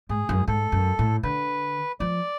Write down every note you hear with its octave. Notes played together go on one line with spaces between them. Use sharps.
G#2 G#4
F#2
G#2 A4
F#2
A2
D3 B4
F3 D5